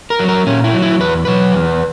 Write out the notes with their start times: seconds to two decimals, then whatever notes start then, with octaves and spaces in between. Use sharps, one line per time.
0.10 A#4
0.19 F#3
0.28 A#4
0.47 A#2 C#4
0.64 E4
0.73 F#3
0.82 E4
1.00 E2 B4
1.25 B2 F#3 B4
1.54 E2